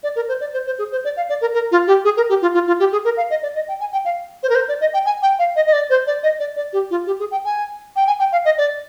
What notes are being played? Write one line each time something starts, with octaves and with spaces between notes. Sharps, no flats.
D5
A#4
C5
D5
C5
C5
G#4
C5
D5
F5
D5
A#4
A#4
F4
G4
G#4
A#4
G4
F4
F4
F4
G4
G#4
A#4
F5
D#5
D5
D#5
G5
G#5
G5
F5
C5
A#4
C5
D5
D#5
G5
G#5
G5
F5
D#5
D#5
D5
C5
D5
D#5
D5
D5
G4
F4
G4
G#4
G5
G#5
G5
G#5
G5
F5
D#5
D5